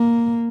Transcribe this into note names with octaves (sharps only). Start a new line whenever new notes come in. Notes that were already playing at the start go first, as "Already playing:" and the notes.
Already playing: A#3